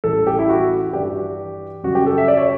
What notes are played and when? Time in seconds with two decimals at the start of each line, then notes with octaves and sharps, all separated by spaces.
0.04 A1 A2 G3 A4
0.27 G4
0.39 E4
0.49 F#4
0.93 G2 E3 G3 D4 G4
1.83 F#2 C#3 G3 F#4
1.95 G4
2.06 A4
2.18 E5
2.28 D5
2.37 C#5